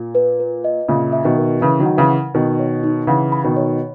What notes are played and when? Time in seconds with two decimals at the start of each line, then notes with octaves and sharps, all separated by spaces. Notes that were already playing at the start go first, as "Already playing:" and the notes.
Already playing: A#2
0.15 B4
0.40 B4
0.64 D#5
0.88 A#2 C#3 E5
1.12 E5
1.25 B2 D#3
1.37 A#4
1.61 C#3 E3 B4
1.80 D#3 F#3
1.86 F#5
1.97 C#3 E3
2.10 F#5
2.34 B2 D#3 A#4
2.59 C#5
2.83 D#4
3.07 C#3 E3 F#5
3.32 B5
3.44 B2 D#3
3.56 C#5